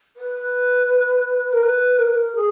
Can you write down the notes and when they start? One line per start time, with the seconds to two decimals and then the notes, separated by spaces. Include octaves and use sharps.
0.16 B4
1.52 A#4
1.63 B4
1.98 A#4
2.07 B4
2.13 A#4
2.35 G#4